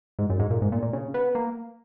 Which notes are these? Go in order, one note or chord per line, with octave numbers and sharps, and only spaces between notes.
G#2
F#2
G#2
A#2
G#2
A#2
A#2
C#3
B3
A#3